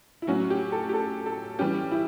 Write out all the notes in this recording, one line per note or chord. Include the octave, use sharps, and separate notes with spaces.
E4
A2 F#3 C#4 F#4
G4
A4
G4
A4
A4
E3 G3 C#4 G4
E4